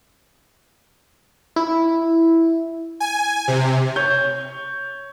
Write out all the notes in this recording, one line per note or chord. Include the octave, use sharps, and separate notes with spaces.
E4
G#5
C3
C#5 G6